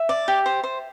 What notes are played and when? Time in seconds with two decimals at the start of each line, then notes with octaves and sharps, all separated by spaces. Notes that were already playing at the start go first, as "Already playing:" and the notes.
Already playing: E5
0.09 D5
0.28 G4
0.46 C5
0.63 C5